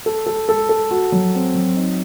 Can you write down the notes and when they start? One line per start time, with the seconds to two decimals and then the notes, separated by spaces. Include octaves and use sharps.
0.06 A4
0.26 A4
0.49 A4
0.69 A4
0.91 F#4
1.12 F#3
1.35 C4
1.55 F#3
1.76 D#4